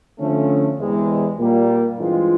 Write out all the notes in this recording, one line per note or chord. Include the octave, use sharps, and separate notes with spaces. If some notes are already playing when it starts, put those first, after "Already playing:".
D3 F3 A3 C#4
E2 C3 E3 G#3
A#2 G3 A#3
G2 E3 G#3 C4 F4